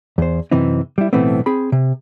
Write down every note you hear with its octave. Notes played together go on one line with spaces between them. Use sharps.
E2 C5
F#2 C3 E3 C4 D#4
G3 E4
B1 A2 E3 A3 B3 C4
C4 G#4 B5
C3